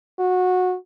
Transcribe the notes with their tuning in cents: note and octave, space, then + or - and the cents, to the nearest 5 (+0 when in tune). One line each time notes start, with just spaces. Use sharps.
F#4 -20